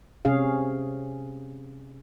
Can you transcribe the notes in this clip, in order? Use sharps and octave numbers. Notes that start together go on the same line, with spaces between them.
C3 C#4 G#4 F5